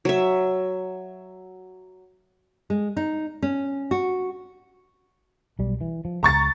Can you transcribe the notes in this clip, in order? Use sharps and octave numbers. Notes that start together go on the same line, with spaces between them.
F#3 E5
G#3
D#4
C#4
F#4
B1 G3
E3
F3
C#2 A#5 C#6 A6